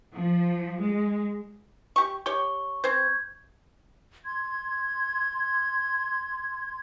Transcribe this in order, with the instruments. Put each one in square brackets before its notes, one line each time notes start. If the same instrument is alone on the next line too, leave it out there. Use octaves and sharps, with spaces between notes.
[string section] F3
G#3
[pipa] G4 C#6
[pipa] G4 C#5 [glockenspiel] C#6
[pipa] C4 C5 [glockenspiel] G6 G#6
[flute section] C6 G#6